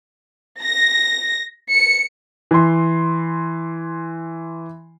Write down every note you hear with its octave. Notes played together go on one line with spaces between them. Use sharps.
A#6
C#7
E3 C6